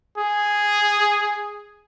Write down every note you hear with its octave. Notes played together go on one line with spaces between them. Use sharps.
G#4